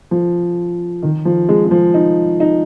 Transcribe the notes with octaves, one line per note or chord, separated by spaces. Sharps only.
F3
D#3
F3
G#3
G#3
F3
D#4
D#4